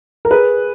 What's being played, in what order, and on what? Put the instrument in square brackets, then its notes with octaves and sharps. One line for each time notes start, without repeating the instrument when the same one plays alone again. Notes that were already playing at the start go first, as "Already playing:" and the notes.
[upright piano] A#4
G#4 B4